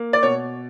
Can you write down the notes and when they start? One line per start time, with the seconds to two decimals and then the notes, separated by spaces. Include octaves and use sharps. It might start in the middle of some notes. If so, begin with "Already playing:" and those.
Already playing: A#3
0.13 D5
0.23 B2 C#5